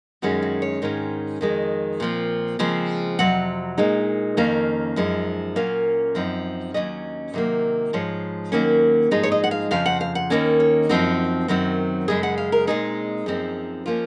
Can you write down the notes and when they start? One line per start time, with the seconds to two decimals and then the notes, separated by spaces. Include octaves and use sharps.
0.22 F#2 D#3 G#3 C#4 F#4
0.42 F#4
0.62 C#5
0.82 G#2 D#3 G#3 C#4
1.41 F2 D#3 G#3
2.00 A#2 F3 C4
2.59 C#3 F3 G#3 C4
3.19 F2 C3 F#3 F#5
3.78 A#2 G#3 D#4
4.37 F2 D#3 A#3 C#4 F5
4.96 F#2 F3 G#3 D#4
5.56 A#2 F#3 A#3 C#4 F5
6.15 F#2 F3 C4 D#4
6.74 D#2 D#3 F#3 C#4 D#5
7.34 C3 D#3 F#3 A#3
7.93 G#2 F3 G#3 C#5
8.52 D#2 D#3 F#3 A#3 C#4
9.11 G#2 F3 G#3 D#4
9.23 C#5
9.32 D#5
9.44 F#5
9.51 F5
9.71 F2 C#3 F3 F5
9.86 F#5
10.01 F5
10.15 F#5
10.30 D#2 D#3 A#3 C#4
10.60 C#5
10.89 F#2 F3 C4 D#4 F#4
11.48 F#2 D#3 F#3 C4
12.08 F#2 C#3 G#3 G#4
12.23 F#5
12.38 F5
12.52 A#4
12.67 A#2 G#3 C4 D#4 G#4
13.26 F#2 F3 C4 D#4
13.86 F3 A#3 C#4 F4